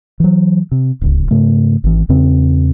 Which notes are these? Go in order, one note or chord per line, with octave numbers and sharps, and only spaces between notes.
E3 F#3
C3
D1 C#2
G#2 C#3 A3
G#1 E3
E2 C#3 C4